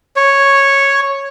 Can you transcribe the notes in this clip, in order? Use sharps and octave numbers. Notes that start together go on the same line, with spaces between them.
C#5